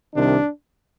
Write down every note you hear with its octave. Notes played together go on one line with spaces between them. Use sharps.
C2 C3 D#3 D4